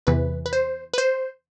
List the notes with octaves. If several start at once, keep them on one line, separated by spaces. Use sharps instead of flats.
E2 C3 E3 B4
B4
C5
B4
C5